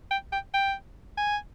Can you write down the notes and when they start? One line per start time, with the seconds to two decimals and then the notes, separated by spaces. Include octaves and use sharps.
0.11 G5
0.32 G5
0.54 G5
1.18 G#5